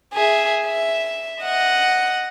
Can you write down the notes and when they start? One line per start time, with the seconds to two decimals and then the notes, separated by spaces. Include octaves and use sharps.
0.14 G#4 E5
0.66 E5
1.42 D#5 F#5